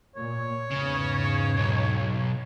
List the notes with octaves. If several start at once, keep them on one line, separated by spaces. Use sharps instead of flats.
A#2 C#5
E2 G#2 C#3
B1